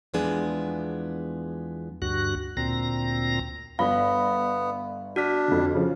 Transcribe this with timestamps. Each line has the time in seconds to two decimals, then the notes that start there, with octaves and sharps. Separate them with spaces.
0.14 E2 F3 G#3 B3 D4 G#4
2.02 D2 G2 F#4 F#6
2.57 D2 A#2 C4 A#5 A#6
3.79 G1 B3 F5 B5 A#6
5.16 D4 F#4 F6 B6
5.48 F2 D3
5.74 C#3 F3